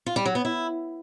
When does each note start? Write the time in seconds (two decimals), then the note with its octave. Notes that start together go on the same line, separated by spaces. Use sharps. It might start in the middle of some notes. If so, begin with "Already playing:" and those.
0.06 F4
0.16 G3
0.26 F#3
0.35 B3
0.45 E4